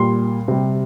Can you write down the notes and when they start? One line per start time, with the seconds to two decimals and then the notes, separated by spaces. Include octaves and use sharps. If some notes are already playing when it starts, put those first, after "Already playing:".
Already playing: A#2 G3 C6
0.48 C3 G3